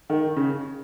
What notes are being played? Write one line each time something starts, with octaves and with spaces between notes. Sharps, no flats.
D#3
C#3